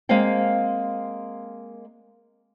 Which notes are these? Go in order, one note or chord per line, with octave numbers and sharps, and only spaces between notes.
G#3 A#3 C4 F5 G5